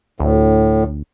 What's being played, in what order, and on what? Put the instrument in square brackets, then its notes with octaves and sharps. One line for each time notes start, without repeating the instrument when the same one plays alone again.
[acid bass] D2 [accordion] A2